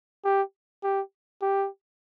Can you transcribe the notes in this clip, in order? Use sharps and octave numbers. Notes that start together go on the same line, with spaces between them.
G4
G4
G4